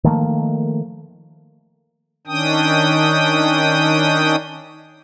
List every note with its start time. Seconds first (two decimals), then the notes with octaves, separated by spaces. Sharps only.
0.04 D#3 F3 A3 A#3
2.27 D#3 C#4 D4 G5 D#6